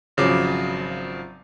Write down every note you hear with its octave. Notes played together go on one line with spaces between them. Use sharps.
G#1 C#3 F3 F#3 D6